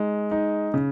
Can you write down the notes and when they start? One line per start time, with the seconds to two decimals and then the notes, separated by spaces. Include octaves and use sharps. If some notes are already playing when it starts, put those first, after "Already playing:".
Already playing: G#3 D#4
0.31 D#4
0.74 C#3